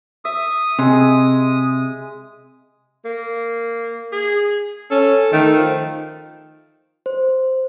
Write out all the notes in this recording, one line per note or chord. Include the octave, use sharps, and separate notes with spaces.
E5 D#6
C3 G#3
A#3
G#4
C#4 A4
D#3 A3
F3
C5